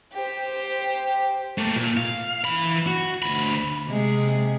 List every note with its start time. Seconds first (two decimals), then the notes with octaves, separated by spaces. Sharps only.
0.13 G4 C5
1.58 A3 A#3
1.76 A#2
1.97 F5
2.45 E3 B5
2.87 F#4
3.22 D2 B5
3.87 C3 G#3